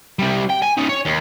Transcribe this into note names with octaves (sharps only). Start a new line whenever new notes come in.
C3 G3
G5
G#5
C#4 D#4
C#5
D#2